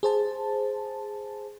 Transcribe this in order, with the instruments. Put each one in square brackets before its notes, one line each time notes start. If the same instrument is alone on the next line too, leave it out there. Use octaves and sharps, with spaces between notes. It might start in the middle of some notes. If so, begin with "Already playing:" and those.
[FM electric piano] G#4 C5 A5